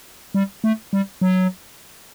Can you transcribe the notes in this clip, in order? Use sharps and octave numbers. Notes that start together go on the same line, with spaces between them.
G3
A3
G3
F#3